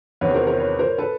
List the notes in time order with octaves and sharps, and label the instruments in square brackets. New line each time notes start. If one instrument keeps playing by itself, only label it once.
[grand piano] E2 C3 D#3 [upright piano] B4 C#5
[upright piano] A#4 C5
A#4 C5
B4 C#5
A#4 C5
A4 B4